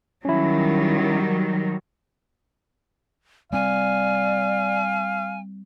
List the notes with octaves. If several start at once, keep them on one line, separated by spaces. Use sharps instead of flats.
D#3 F#3 G3 C#4 E4
G3 C4 D5 F5 G#5